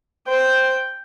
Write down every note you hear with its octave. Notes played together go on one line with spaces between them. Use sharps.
C5 G5